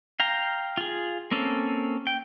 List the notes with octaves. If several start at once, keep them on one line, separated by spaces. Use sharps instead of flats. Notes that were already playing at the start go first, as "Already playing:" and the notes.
F5 G5 A#5
F4 G#4
A#3 C4 C#4 A4
G5